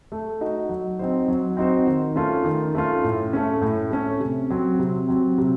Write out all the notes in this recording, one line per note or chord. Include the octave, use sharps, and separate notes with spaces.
A3
D#4 F#4
F#3
C4 D#4 F#4 C5
F#3
C4 D#4 F#4 C5
D#3
A3 C#4 F4
D#3
A3 C#4 F4
A2
A3 C#4
A2
A3 C#4
C3
F#3 C4
C3
F#3 C4
C3